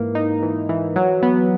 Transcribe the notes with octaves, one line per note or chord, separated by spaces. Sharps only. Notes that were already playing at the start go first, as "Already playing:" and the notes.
Already playing: G#2 E3 A#3
D#4
E3
E3
F#3
B3